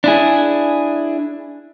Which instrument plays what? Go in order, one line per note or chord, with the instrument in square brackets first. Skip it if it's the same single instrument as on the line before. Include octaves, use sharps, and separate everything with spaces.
[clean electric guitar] D4 E4 G#4